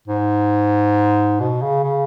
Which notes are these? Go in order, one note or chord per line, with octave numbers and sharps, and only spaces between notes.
G#2
B2
C#3
C#3